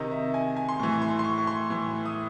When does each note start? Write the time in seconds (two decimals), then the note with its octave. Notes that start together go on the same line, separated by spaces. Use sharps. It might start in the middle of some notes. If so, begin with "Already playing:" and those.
Already playing: C3 D#3 D#5
0.11 E5
0.34 G#5
0.57 G#5
0.69 C6
0.79 A2 E3 C#6
1.02 C6
1.19 C6
1.24 C#6
1.38 C#6
1.47 C6
1.70 A2 E3
2.05 D#6